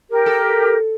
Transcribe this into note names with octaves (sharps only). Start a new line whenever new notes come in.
G4 A#4
A4